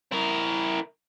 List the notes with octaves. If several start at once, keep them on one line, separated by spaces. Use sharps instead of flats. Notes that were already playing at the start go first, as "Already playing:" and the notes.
E4 A#4